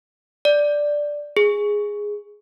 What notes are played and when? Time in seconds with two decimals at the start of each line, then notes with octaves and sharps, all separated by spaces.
0.45 D5
1.37 G#4